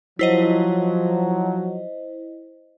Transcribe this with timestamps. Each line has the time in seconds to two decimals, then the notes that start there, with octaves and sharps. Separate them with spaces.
0.19 F3 F#3 E4 C5 D#5